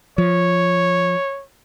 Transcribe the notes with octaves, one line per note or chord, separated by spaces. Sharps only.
F3 C#5